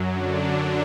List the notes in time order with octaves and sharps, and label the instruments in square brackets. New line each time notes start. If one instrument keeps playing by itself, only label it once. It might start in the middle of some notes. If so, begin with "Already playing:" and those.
Already playing: [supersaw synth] F#2 F#3
D3 D4